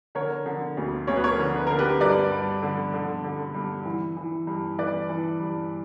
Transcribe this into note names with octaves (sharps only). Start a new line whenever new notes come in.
D3 A#4 C#5
D3
D2
D2 C#5
B4
A#4 C#5
D3
B4
D3 A#4
G4 B4
G2 B4 D5
G2
D3
D3
D3
G2
E3
E3
G2
E3 B4 D5
E3
G2